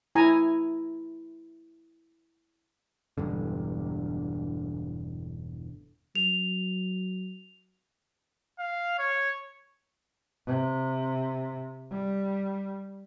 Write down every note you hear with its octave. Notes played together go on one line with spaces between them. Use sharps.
E4 G#5 A#5
E1 G2 D3
F#3 F7
F5
C#5
C3
G3